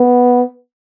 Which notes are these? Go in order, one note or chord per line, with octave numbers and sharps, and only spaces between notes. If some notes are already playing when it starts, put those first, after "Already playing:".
Already playing: B3